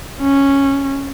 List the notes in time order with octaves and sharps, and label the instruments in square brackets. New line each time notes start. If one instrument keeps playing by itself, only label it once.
[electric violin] C#4